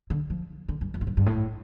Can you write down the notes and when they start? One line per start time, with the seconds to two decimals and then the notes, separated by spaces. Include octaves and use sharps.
0.10 D3
0.30 F3
0.68 D3
0.81 G2
0.94 F2
1.01 A2
1.07 G2
1.17 G2
1.26 A2